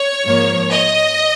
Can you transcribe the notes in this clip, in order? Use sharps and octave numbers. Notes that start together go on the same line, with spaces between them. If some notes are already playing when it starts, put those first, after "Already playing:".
Already playing: C#5
G#2 F3 A#3
D#5